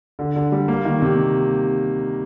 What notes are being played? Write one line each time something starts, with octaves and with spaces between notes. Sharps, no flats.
D3
D3
G3
A#3
D#3
C3